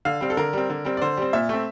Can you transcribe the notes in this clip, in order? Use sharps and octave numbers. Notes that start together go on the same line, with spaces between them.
D3 F5
G3 C4
A4
D3 A#4
G3 C4
D3
G3 C4
D5
D3 C5
G3 C4
A#2 E5
A3 C4